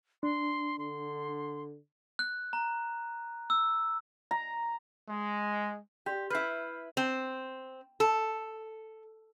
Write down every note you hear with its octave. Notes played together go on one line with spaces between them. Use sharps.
D4 C6
D3 C6
F#6
A#5
E6
A#5
G#3
G4 D5 C6 G6
E4 B4 F6 G6 C7
C4
A4